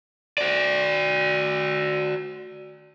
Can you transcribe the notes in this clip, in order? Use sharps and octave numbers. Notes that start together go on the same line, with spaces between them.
F#4 D5